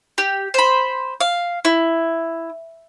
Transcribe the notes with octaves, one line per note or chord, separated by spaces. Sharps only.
G4
C5 B5
F5
E4